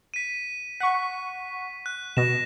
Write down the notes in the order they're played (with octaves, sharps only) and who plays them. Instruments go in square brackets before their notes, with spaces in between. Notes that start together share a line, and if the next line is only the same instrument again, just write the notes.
[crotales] B6 D#7
[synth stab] F#5 C#6 [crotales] B6
[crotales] F#6
[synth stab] B2 [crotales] A#6 E7